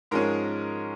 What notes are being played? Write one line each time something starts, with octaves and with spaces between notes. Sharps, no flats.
G#2 F3 G#3 C#4 A#4